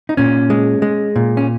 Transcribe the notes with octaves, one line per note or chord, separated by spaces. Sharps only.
D#4
A#2 C#4
G#3
G#3
A#2
C#4